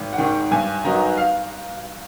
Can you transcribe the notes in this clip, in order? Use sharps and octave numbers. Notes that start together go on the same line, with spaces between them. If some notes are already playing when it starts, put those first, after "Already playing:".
Already playing: G#1
F#5
G#2 D#3 G5
G2 G#5
D#3 F#3 B3 D#4 A#5
F5